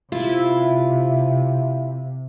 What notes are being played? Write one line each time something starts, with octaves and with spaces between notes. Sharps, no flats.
C3 E4 F4